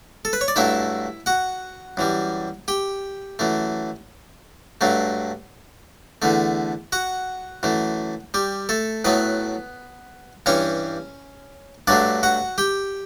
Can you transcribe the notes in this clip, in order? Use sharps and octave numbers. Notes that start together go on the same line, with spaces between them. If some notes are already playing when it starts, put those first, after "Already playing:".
A4
B4
C#5
D5
G2 F#3 A3 E4 E5
F#4 F#5
F#2 E3 G3
G4 G5
F#2 E3 A3
G2 F#3 A3
E2 D3 A3
F#4 F#5
F#2 E3 A3
G3 G4
A3 A4
A2 F#3 A3 B3 B4
G2 E3 G3 C#4 C#5
G2 F#3 A3 D4 D5
F#4 F#5
G4 G5